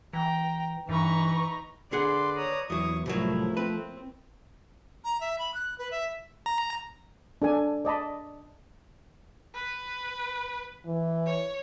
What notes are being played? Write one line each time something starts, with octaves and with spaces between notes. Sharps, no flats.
E3 G5 A#5
G2 E3 D#4 B4 A#5 C#6
D3 G#4 B4 D5 F#5 C6
C#5 A#5 D#6
E2 F#3 E4 C#6 D#6
C2 A2 F3 F#3 A3 E4 A#4
C4 B4
A#5
E5
B5
F#6
B4
E5
A#5
D4 A4 G#5
D5 D#5 A5 B5
B4
E3
C#5